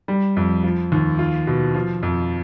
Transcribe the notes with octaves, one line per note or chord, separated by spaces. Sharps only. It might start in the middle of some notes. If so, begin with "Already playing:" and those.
G3
F2
F3
D#2
F4
B2
F3
F2